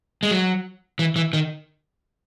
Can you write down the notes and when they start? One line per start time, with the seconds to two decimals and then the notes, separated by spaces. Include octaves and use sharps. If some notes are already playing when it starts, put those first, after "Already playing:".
0.23 G#3
0.31 F#3
0.99 E3
1.16 E3
1.33 D#3